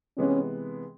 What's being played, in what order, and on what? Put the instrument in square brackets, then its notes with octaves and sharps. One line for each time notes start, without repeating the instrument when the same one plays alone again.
[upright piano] C3 E3 G#3 B3 [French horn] C#4